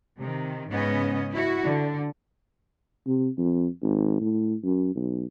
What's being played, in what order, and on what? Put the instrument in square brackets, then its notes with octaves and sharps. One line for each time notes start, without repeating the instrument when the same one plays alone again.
[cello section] C3 D#3
G#2 C#3 B3 C#4 D#5
E4 F#4
D3
[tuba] C3
F2
G#1
A2
F#2
B1